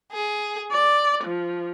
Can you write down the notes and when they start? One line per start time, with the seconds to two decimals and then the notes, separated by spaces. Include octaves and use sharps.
0.10 G#4
0.72 D5
1.24 F3